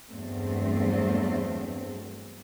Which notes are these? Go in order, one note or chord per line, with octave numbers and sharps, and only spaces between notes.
E2 G2 F#3 A3 C4